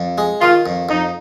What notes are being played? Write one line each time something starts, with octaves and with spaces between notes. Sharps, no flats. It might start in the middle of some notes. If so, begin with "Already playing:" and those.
Already playing: F2
G#3
D#3 F4
F2
F2 D#4